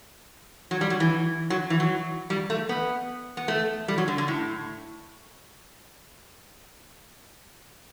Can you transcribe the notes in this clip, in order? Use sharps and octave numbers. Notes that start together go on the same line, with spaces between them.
F#3
G3
F#3
E3
F#3
E3
F#3
G3
A3
B3
B3
A3
G3
F#3
D3
D3
A2